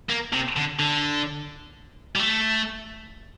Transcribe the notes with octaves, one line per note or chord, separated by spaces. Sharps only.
A#3
C3
D3
D3
G3
A3